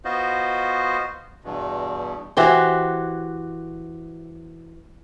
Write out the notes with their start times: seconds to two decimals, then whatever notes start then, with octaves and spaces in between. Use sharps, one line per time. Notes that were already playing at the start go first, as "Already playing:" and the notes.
0.05 B3 F4 F#4 C5 D#5
1.44 E2 G2 B2
2.37 E3 F#4 G4 C5